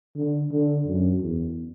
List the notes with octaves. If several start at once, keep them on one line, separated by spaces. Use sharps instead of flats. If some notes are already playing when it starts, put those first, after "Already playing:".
D3
D3
F#2
E2